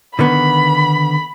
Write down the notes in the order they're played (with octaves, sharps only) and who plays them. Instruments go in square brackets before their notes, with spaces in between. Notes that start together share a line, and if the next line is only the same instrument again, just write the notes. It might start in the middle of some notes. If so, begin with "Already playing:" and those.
[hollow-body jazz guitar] D3 D#3 B3 [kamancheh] B5